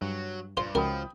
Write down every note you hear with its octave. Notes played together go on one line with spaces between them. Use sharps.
G2 F#3
G2 F4 C5
C#2 F3 F#4 A#4 G5 B5 D#6